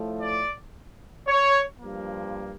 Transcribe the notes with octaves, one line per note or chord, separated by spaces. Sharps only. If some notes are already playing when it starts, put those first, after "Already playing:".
Already playing: A2 F3 A3
D5
C#5
G2 F3 A#3